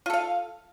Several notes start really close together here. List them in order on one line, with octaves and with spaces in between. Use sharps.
F4 A4 F5